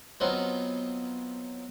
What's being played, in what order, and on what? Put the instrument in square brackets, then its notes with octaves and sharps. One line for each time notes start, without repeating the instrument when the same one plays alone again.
[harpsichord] F#3 B3 C4 D#4 F4